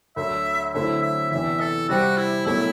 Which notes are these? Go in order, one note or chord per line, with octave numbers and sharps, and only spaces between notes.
D2 D3 F#3 E5
D3 F#3 A3 C4 E4 E5
E5
E2 C3 E3 E5
A4
C3 G3 C4 F#4 G4
E4
C2 B2 F#3 A3 E4